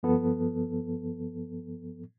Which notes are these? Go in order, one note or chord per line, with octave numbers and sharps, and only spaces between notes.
G2 F3 B3 A4